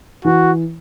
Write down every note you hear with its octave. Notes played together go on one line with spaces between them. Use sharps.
E3 F#4